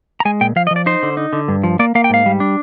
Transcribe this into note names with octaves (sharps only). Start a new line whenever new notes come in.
A#5
G#3 G#5
A#2 G5
F3 F5
D#5
F3
D5
D#4 C5
D3
D#4
D3
G2
F3
A#3 D5
A#3 F5
G5
G#2 F5
G3
D4